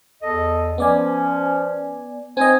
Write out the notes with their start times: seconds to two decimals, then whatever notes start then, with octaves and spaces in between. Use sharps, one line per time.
0.22 E2 A4 D#5
0.78 F3 B3 C#4 D5 G#5
2.37 C4 D#4 D#5 G#5